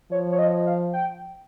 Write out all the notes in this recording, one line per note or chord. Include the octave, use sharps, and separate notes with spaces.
F3 C#5
C#5
D#5
F5
G5